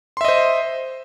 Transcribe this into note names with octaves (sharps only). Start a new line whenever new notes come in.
C5 D#5 E5 C6